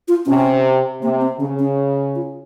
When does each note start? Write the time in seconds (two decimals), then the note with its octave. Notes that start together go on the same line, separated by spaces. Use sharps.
0.08 F4
0.26 C3 C#4
1.02 C3 A#3
1.21 C4
1.40 C#3 C#4
1.59 C#4
2.15 F4